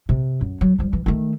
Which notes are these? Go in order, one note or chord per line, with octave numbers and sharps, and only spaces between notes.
C3
F#2
F#3
F3 G3
E3
D#3 A3